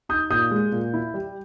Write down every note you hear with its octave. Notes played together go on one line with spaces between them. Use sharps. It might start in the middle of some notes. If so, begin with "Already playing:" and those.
D#4 D#6 G6
A#2 D#6 G6
G#3
A#2
E4
G3